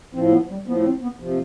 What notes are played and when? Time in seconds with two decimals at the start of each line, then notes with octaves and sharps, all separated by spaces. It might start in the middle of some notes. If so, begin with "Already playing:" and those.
0.14 A2 F3 C4
0.32 B3
0.49 G3
0.67 A2 F3 B3
0.85 C4
1.02 B3
1.20 C3 F3